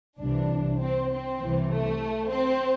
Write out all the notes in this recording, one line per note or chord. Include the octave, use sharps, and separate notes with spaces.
C2 C3 E3 D4
C4
C4
C2 C3 E3
A3
C4